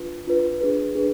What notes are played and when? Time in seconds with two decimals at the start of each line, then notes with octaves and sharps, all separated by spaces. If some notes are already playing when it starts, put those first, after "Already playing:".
Already playing: D4 F4 B4
0.26 D4 F4 B4
0.60 D4 G#4 B4
0.95 D4 G#4 B4